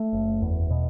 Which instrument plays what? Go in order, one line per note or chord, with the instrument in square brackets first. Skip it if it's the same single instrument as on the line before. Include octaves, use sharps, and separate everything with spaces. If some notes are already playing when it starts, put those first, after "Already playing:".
Already playing: [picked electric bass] A3
F#1
E2
B2